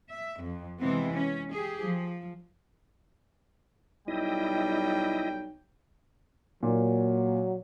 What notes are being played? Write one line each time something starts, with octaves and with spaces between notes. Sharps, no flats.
E5
F2
C3 E3 G#3 B3 C4
C#4
G4 G#4
F3
B1 G3 E4 D#5 G5
A#2 F#3 A#3